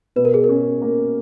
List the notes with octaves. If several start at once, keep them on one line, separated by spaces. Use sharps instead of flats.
B2 B4
A#4
G#4
A#4
C#4
A#3